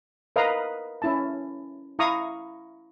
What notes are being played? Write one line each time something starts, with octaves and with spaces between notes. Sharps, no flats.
A#4 B4 D#5 F5 A#5
C#4 E4 A5
E4 F5 A#5 C#6 D#6